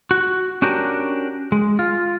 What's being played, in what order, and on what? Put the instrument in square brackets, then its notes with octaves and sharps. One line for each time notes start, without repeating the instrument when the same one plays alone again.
[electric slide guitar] F#4
C#4 D4 F#4 G4 A#4
G#3
F4